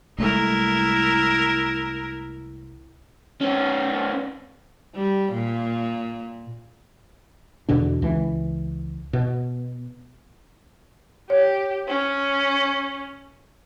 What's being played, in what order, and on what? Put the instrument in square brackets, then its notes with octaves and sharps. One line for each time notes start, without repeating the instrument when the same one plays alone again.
[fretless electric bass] C2 G#3 A3 [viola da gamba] E4 A#4
[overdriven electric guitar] B3 C#4
[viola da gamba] G3
A#2
[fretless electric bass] E2 B2 D3 D4
C#2 E3
B2
[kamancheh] G4 [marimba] C#5
[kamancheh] C#4